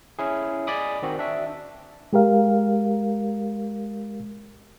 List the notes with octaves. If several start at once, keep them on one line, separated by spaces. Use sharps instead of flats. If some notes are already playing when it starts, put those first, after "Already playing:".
C#4 E4 G#4
D5 D#5 G#5 B5 D6 D#6
D#3 C4 F#4
D4 E5
G#3 G4 A#4 F5